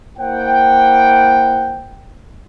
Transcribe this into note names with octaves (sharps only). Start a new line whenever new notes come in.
A#3 E4 C5 F#5 G5